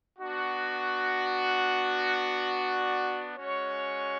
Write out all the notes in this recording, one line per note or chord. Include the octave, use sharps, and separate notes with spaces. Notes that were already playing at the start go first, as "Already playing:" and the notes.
B3 D4 F#4
D5
G#3 C#4 F#4 C#5